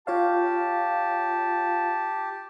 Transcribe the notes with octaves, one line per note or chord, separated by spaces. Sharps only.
F4 G4 C#5 F5 A5